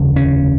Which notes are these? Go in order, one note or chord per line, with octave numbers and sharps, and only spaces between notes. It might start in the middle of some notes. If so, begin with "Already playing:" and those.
Already playing: F1 D#2 C#3
C#4